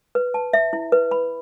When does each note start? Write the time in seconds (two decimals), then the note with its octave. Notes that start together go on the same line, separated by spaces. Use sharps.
0.15 B4
0.34 A5
0.53 E5
0.73 E4
0.92 B4
1.11 B5